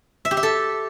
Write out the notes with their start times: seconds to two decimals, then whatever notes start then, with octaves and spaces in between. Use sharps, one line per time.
0.25 E5
0.31 G4
0.37 E5
0.43 A4